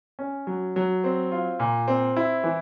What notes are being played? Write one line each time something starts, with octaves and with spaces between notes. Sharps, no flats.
C#4
F#3
F#3
C4
F4
A#2
C4
E4
E3